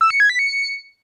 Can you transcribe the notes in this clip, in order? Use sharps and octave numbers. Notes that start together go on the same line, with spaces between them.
E6
C#7
G#6
B6
C#7